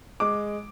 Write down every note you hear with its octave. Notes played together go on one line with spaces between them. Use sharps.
G#3 D6